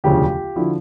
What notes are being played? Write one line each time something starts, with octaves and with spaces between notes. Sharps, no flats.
E1 D2 C#3 F3 F4 G4
D3 F3 E4 F#4